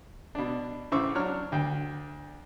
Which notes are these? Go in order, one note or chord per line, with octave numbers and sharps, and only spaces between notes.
B2 D4
A1 C#3 C5 C#6 D6 E6
F#3 D4 C#5 F6
D2 G5